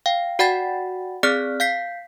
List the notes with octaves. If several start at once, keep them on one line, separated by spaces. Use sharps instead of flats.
F5 G5
F#4 D5 F#5 G5 B5 A6
C4 G#4 D5 F6 F#6 B6
F5 G6 B6 C7